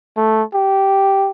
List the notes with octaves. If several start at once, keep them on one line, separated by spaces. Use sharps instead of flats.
A3
G4